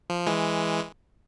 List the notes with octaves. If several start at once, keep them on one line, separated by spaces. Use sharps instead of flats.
F3
E3 G#3